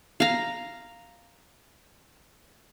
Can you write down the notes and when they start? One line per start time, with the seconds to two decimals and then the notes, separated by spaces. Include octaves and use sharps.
0.20 F5 A#5